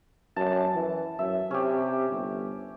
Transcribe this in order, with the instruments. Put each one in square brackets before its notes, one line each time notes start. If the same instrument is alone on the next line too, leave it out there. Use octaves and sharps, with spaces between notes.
[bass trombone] F#2 [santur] A5
[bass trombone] E3
[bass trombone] F#2 [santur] E5
[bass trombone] C3 [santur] C#4 G4
[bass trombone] G1